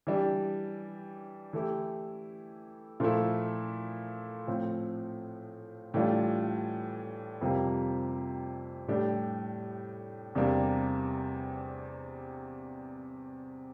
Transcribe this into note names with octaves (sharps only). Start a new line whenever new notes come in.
E3 G3 D4 G4
E3 A3 E4 G4
A#2 F3 A3 E4
A2 F3 C4
A2 E3 G3 D4 F4
F2 C3 G3 A#3
A2 G3 D4 G4
E2 C3 G3 A#3 D4